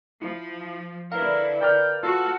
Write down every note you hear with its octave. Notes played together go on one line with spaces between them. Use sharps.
F3 E4
D3 E4 A#4 B4 F5
A#4 D5 G5 F6
F4 F#4 A4